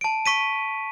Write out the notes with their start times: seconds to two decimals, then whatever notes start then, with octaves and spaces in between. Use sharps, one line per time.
0.01 A5 D7
0.26 C#6 B6 D#7